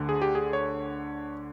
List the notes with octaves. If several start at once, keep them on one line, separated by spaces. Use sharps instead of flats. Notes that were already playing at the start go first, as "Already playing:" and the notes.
Already playing: D2 D3
G#4
G4
G#4
C#5